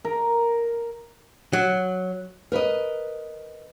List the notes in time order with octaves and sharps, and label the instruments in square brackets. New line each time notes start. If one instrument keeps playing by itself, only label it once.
[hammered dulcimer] A#4
[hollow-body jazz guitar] F#3
[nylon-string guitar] A#4 B4 D5 D#5